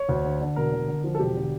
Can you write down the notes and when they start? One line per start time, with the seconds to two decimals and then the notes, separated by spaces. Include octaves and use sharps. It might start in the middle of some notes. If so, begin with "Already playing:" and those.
Already playing: C#5
0.09 D2
0.25 D3
0.41 D3
0.56 E1 A#4
0.72 D3
0.88 D3
1.04 F3
1.15 A4
1.19 E1 G4
1.36 D3